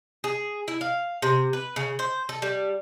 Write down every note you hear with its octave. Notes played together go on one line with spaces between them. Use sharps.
G#4
E4
F5
C3
B4
C#3
C5
A4
G3